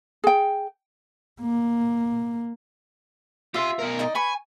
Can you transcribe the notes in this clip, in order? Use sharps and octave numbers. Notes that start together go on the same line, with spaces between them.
G#4 G5
A#3
F4 G4 E5 C6
B2 A#4
D#4 D5 D#5
B4 G#5 B5 C#6